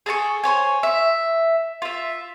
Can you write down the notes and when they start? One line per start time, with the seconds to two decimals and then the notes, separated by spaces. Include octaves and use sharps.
0.06 G#4 A4 A5 C#6
0.44 C5 C#5 G#5
0.83 E5
1.82 F4 E5